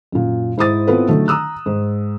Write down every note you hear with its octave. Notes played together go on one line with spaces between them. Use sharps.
F#2 A#2
G#2 E4 C5 D#6 A6
B3 C4 E4 F4 A4 B4
D3 D#3 F#3 A3
A#5 D#6 E6 F#6
G#2